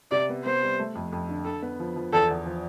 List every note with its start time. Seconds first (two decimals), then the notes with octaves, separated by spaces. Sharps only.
0.11 C3 D5
0.29 B3
0.45 B3 C5
0.62 G3
0.79 A3
0.95 F2
1.12 F2
1.29 D3
1.45 D3 A4
1.62 B3
1.80 F3
1.96 F3
2.13 E2 A4
2.30 E2
2.46 F3